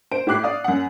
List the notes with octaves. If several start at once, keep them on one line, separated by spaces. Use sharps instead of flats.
C5 D7
A2 G4 D6 F#6 C7
D5 F5 D#6
F#2 F#5